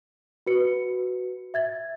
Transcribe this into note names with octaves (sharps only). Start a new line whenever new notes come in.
F#4 B4 C#7
E5 G#6 A6